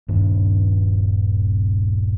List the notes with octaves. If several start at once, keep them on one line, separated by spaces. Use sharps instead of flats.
D#1 G2